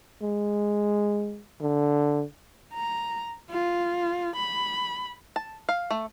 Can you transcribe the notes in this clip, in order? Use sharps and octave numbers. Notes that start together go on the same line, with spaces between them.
G#3
D3
A#5
F4
B5
A5
F5
A3